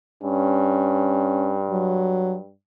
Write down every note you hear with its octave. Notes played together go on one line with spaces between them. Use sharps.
G2 C#4
F#3